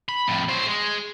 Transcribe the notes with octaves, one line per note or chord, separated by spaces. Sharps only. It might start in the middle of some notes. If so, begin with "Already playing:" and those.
B5
F2 A2
F#3 C5
G#3